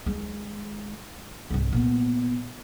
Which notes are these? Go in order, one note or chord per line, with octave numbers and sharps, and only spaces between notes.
D#3 G#3
C2 G#2
A#2 B3